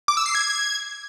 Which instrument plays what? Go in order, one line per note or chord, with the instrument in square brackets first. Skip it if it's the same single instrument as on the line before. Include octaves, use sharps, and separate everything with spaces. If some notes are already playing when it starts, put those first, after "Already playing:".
[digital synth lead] D6
E6
C7
G#6